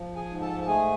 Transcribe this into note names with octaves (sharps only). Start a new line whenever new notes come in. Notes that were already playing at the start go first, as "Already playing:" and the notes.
Already playing: F3
G#4 G#5
G#2
A4 A5
A5
A3 G#4 G#5